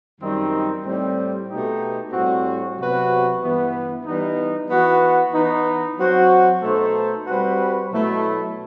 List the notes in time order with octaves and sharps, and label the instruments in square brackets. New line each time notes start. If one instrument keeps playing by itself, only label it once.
[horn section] F#2 D#3 G3 C4 D#4
A2 G3 C4
B2 A3 D#4 G4
A2 G3 C4 F#4
C3 F#3 B3 F#4 B4
G2 E3 B3 E4
E3 G3 B3 D#4
E3 B3 F#4
E3 B3 D#4
F#3 C4 F#4 C5
B2 A3 D#4 A4 C5
G3 C4 F#4 B4
B2 F#3 A3 E4